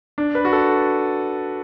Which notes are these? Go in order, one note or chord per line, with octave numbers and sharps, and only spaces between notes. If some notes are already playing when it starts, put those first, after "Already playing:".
D4
B4
F#4
A4